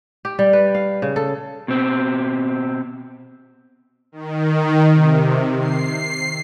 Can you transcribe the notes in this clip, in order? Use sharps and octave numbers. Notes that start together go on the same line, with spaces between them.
G4
G3
B4
F5
C#3
A4
B2 C4
D#3
C3
C7